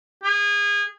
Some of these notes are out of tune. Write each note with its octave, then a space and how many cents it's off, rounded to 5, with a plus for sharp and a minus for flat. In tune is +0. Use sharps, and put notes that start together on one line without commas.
G#4 -25